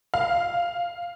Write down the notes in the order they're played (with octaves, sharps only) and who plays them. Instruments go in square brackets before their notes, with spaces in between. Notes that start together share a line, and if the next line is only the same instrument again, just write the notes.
[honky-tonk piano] F5